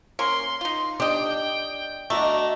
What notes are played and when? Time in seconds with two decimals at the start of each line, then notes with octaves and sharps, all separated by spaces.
0.19 A#3 C#4 A#4 C6
0.61 D#4 F4
1.00 D4 G4 D#5 G5
2.10 A3 D4 F#4 D#5 A#5